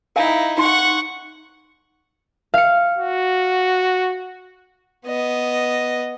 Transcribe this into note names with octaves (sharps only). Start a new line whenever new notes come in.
D#4 E4 A#4 F5 G#5
D#4 F#5 C6 C#6
F5 C#7
F#4
B3 D#5